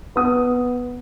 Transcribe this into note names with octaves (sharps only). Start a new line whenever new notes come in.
B3 D#6